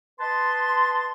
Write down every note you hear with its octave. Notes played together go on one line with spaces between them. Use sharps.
B4 D#5 A5 C6